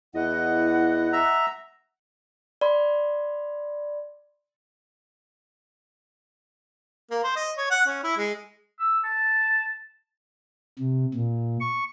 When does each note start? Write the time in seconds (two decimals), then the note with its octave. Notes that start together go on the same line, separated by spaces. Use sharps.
0.15 E2 E4 D#5 F#5
1.13 E5 A#5
2.61 D5 B5 C6
7.11 A#3
7.24 C5
7.36 D#5
7.58 C#5
7.71 F#5
7.87 C#4
8.04 E4
8.17 G#3
8.79 E6
9.04 A5
10.79 C3
11.14 A#2
11.60 C#6